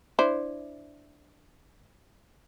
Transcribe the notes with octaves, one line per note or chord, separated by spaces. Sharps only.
D4 E4 C5